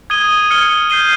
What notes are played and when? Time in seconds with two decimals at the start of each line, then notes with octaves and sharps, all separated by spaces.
0.10 D#6 G#6 D#7 G7
0.50 F6 G#6 C#7 G7
0.90 G6 C7 D#7 G7